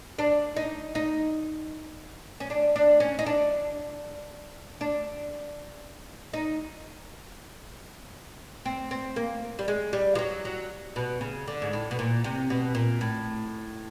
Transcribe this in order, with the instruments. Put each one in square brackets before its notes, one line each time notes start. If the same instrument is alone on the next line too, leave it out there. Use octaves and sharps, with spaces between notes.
[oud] D4
D#4
D#4
C#4
D4
D4
C#4
D#4
D4
D4
D#4
C4
C4
A#3
G3
G#3
G3
F3
F#3
F#3
B2
C#3
D3
G#2
A2
B2
A#2
C3
B2
A#2
A2